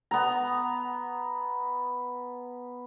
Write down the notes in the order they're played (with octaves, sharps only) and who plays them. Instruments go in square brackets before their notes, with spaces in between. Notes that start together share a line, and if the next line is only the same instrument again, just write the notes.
[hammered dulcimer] B3 A#5